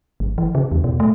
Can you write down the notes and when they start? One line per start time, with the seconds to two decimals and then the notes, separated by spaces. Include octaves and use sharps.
0.20 G1
0.38 E3
0.55 C#3
0.72 E2
0.84 B2
1.00 A3